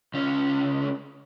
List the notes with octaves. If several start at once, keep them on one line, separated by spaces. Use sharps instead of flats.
C#2 C#4